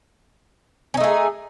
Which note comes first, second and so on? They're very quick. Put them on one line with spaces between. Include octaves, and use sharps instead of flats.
C#4 D#4 A3 G#4